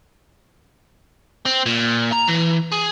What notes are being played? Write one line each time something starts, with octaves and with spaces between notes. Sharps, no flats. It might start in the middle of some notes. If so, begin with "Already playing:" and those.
C4
A#2
A#5
E3
G#4